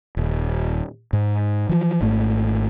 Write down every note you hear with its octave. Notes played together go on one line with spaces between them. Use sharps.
D#1
G#2
E3 F3
G#1 G#2 A3